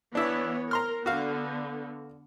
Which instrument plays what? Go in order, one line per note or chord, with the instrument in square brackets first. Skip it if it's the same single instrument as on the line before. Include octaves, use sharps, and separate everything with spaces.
[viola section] E3 B3 C#5 [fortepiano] D4 E4
[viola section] A#4 [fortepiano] A#5 C6 F6
[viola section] D3 B3 [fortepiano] F#4 F5